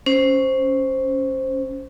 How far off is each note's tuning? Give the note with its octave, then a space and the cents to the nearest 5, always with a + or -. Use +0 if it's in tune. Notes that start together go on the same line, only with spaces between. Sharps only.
C#4 +0 C5 +0